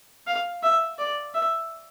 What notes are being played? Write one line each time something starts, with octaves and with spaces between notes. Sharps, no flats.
F5
E5
D5
E5